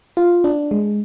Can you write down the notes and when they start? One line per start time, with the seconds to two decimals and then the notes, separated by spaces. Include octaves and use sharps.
0.17 F4
0.44 D4
0.71 G#3